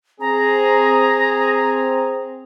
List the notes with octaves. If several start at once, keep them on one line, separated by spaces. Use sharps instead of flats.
C4 G#4 A#5